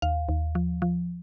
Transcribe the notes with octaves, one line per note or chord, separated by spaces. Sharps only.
D#2 F5
D#2
F3
F3